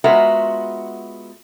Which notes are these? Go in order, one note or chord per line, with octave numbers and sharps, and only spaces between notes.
G#3 B3 F4 F#4 A#4 E5